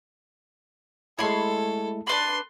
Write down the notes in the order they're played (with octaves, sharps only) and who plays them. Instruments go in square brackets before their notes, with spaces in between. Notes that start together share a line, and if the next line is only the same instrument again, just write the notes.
[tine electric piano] G#3 A3 E4 [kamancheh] A4 [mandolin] C#5 B5 C6
[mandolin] D4 B4 B5 [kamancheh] C6